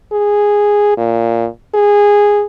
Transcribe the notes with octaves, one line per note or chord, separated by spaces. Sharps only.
G#4
A#2
G#4